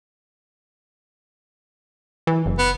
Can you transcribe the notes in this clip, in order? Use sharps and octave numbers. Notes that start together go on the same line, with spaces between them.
E3
F#1
B3